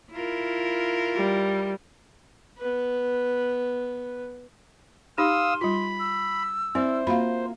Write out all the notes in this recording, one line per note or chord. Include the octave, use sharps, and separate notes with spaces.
E4 F4 A#4
G3
B3 B4
D#4 G4 F5 C6 D#6 E6
G3 F4 B5
E6
C4 E4 C5 D5
A#3 F4 F#4 F5 B5